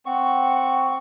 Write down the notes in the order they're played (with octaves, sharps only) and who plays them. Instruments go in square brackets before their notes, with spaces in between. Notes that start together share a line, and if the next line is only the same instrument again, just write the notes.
[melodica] C4 C#6 [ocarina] F#5